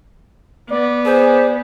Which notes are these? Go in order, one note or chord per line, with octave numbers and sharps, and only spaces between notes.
B3 D5
G#4 C5